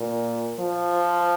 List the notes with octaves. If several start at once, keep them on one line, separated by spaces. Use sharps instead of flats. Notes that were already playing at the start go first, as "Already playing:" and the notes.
Already playing: A#2
F3